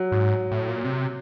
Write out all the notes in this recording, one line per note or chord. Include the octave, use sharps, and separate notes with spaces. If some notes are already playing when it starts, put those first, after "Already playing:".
Already playing: F#3
G#2
A2
A#2
C3